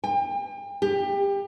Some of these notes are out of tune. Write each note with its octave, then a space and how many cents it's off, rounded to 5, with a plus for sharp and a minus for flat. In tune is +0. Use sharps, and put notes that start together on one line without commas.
G5 +40
G4 +25